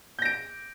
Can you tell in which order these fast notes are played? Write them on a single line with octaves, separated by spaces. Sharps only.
G6 A#6 D7